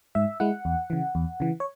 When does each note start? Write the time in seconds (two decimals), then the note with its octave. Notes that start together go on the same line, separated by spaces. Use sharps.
0.15 G#2 E5
0.40 G#3 E4 F#5
0.65 E2
0.90 C#3 E3
1.15 E2
1.40 C#3 E3
1.60 C#5